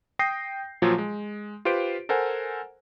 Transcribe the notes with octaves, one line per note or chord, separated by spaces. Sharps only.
G5 D#6 G6 A#6 C7
A#2 F3 F#3 F4
G#3
F4 G4 B4 C5 D7
A4 A#4 C5 F#5 G#5